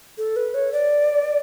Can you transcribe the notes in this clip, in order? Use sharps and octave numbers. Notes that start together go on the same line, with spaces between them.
A4
B4
C#5
D5